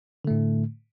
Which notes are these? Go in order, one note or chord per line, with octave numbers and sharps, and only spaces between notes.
A2 D3 A3